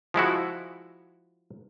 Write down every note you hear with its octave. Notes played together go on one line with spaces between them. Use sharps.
F3 G#3 E4 F#4